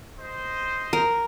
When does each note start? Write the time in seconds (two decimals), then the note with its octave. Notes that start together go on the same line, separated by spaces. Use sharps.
0.19 C5 D#5
0.93 A#4